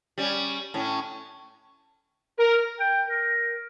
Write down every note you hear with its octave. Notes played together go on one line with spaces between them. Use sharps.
G3 C#4
A2 C#4
A#4
G5
A#4